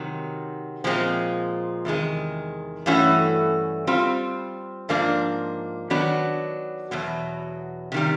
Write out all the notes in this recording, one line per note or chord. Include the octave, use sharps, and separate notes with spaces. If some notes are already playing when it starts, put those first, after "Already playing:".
Already playing: C3 D#3 F#3
A#2 F3 G#3 C4
E2 C3 D#3 G#3
G2 E3 A3 C#4 F#4
G3 C4 F4
G#2 F3 A#3 D4
D#3 F#3 B3 D4 F#4
E2 B2 F#3
C3 D#3 G3